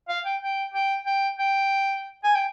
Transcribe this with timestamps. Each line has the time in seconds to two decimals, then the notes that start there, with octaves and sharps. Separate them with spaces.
0.09 F5
0.25 G5
0.42 G5
0.74 G5
1.06 G5
1.38 G5
2.24 G#5
2.35 G5